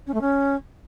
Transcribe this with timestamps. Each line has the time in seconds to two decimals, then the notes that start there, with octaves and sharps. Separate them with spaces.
0.06 C#4
0.14 A3
0.21 C#4